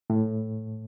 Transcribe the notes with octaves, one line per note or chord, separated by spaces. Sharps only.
A2